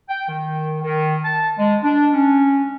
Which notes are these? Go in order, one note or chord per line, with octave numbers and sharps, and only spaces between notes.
G5
D#3
D#3
A5
G#3
D4
C#4